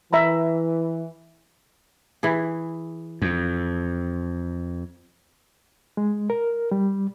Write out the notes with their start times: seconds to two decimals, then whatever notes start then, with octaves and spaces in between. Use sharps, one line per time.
0.13 E3 E5 A#5 B5
2.23 E3 E4 G#4
3.22 F2
5.97 G#3
6.30 A#4
6.71 G3